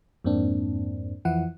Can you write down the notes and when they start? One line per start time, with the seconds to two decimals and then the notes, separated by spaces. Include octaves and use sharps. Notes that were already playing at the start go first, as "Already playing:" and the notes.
0.24 F2 G#2 A#3 C4 D4
1.25 F2 E3 F3 E4 F#5